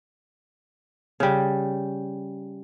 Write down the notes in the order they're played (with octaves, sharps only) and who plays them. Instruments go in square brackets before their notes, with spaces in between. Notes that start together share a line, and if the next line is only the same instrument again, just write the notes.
[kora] C#3 G3